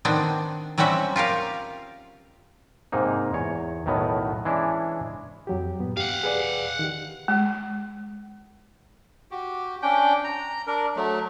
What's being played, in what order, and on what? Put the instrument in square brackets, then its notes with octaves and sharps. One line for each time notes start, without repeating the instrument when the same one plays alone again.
[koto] D#3 B3 C4 D4
F#3 G3 C4 C#4 F#4 E5
F4 G4 A#4 F5
[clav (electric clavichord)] G#2 C3 A#3 D#4
E2 C#5
B1 A2 D#3 F#3 B3
E3 G#3 C#4 D4 E4
[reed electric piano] F2 F#3 G4
G2 A#2 B3
[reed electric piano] G4 [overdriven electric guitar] F5 F#5
[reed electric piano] G#4 B4 D5
D#3 G4
[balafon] G#3
[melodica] F#4 G4
C#4 D4 G5
A#5
D4 A#4
F#3 A3